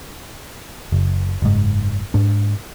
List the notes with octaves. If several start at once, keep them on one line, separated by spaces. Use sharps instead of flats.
F#1
F#1 G#2
G#2 D4